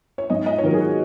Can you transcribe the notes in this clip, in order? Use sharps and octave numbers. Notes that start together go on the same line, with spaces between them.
C#5
G#2 D#5
D#5
C#5
D#3 F#3 A#4
G#4
F#4